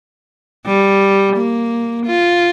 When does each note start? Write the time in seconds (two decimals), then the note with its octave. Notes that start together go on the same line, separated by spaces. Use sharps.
0.67 G3
1.37 A#3
2.07 F4